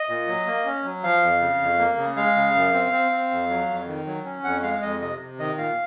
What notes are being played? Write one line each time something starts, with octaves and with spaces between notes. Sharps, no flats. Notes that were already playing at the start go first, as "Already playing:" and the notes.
Already playing: D#5
A#2
F#3
A#3
C#4
F#3
F3 F5
F2
C#3
F2
A#3
C#3
G#3 F5
C#3
F#2
C4
C4
C4
F2
F#3
F2
D#3
F#3
C#4
F2 F#5
G#3 F5
F2 D#5
C3 D#5
C3
D#3 D#5
A#2 F5